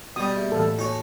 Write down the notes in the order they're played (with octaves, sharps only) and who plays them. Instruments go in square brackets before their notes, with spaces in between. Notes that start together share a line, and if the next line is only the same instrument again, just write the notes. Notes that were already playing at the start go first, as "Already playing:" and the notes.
[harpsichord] B2 G3 [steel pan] D#6
[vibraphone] A#3 G#4 [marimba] E5
[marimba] A2 E3 [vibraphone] A3 F5 F#5 [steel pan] A4
[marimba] A#3 [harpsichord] D#4 C#5 [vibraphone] F#4 A5